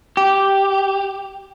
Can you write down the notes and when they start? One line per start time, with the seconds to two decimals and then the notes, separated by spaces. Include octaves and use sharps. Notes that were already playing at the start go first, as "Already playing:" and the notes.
0.17 G4